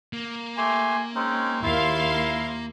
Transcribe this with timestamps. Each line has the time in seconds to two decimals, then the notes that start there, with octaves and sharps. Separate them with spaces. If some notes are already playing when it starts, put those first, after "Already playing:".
0.13 A#3
0.57 A3 G4 G#5 C6
1.15 G#3 C4 C#4 D#4
1.63 D#2 E4 F4 F5 C6
2.14 A#5